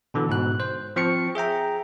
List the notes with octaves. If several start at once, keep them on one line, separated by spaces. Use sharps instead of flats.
B2 D3 E3
G#2 B2 F#6
C5
F3 C4 C#6 C#7
G#4 E5 G5 A#5